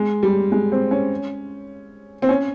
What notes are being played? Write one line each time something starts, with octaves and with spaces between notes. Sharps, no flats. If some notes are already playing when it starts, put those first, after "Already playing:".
Already playing: G#3
G3
G#3
C4
C#4
C4
C#4